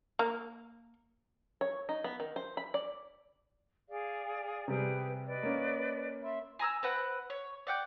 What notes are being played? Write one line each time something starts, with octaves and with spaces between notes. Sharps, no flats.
A#3
C#5
D#4
B3
D#3
C5
B5
D5
G#4 D5 F5
C3 G3 G#4 B4 G5
B4 D5 D#5
A#3 C#4
E5 B5 C6
G#5 A#5 D#6 E6
C4 B4 F#5
C#5
D5 F#5 G5